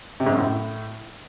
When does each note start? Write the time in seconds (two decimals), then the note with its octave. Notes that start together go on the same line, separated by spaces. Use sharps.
0.20 C3
0.26 G#2
0.32 F#2
0.38 A2